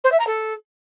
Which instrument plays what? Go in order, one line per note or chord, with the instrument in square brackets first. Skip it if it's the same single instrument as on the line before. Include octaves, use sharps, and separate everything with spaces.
[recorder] C5
E5
A#5
A4